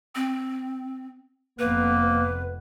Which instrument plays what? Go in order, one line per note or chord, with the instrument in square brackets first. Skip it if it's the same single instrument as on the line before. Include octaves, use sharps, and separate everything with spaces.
[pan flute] C4
[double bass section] F1 F2 B3 [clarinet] A#3 [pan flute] B4